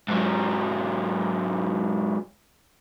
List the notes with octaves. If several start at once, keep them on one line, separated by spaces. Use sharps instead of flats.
G#2 F#3